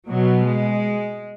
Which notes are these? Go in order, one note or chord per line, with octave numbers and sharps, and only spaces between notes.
B2 F#3
G#3